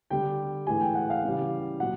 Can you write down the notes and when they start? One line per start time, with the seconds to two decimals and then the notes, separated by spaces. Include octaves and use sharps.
0.10 D3 G3 G5
0.67 A2 E3 G#3 G#5
0.81 G5
0.95 F#5
1.10 F5
1.24 C#3 E3 G3
1.80 A#2 F#3 F#5